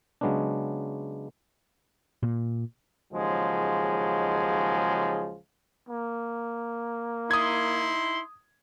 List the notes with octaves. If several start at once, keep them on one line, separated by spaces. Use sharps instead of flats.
C#3 F#3 G#3 B3 C#4 D4
A#2
D#2 C#3 F3 F#3 G#3
A#3
D#4 E4 C6 D#6 G#6